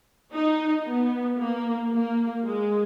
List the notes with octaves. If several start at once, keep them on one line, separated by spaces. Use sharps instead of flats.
D#4
B3
A#3
A#3
G#3